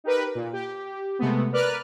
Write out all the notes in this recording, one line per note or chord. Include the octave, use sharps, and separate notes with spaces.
D#4 G4 A#4 B4
A#2
G4
C3 G#3 A3 B3
A#4 B4 D5 F6 F#6